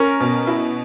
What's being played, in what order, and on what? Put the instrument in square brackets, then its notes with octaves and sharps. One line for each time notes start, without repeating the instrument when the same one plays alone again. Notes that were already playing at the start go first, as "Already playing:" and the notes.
Already playing: [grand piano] C#4 [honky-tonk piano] A#4
[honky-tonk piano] B2
E4